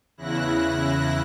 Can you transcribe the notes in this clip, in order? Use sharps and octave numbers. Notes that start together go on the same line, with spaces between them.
E2 C#3 E4 F#6 A#6